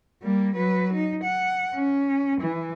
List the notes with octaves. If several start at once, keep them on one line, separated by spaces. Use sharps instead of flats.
G3 A#3
F#3 B4
D#4
F#5
C#4
E3